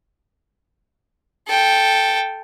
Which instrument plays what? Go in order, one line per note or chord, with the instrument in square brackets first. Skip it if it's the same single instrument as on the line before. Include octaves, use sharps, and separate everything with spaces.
[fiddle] A4 G5